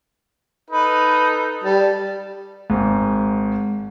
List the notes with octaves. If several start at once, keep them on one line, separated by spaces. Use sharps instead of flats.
D#4 A4 B4
G3 A5
G#1 G#2